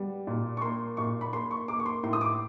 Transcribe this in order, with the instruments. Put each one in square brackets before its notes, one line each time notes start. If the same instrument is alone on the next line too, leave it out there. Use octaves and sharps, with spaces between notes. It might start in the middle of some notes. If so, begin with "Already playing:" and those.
Already playing: [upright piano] G3 B3
A#2
C#6
A#3 C6
A#2 C#6
B5
A#3 C6
C#6
A#3 D6
C#6
C6
A2 C6
D#6
D6